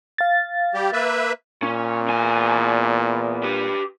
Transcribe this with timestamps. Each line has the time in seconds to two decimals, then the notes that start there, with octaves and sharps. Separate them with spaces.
0.18 F5 A6
0.74 G3 G4
0.93 A#3 B4 E5
1.63 A#2 C#4
2.08 E2 G#5
3.43 G4 B4